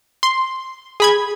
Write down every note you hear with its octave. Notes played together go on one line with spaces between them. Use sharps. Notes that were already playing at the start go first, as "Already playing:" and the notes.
C6
G#4 B5 G#6